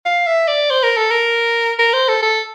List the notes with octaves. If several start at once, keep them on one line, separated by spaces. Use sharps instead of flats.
F5
E5
D5
C5
A#4
A4
A#4
A#4
C5
A4
A4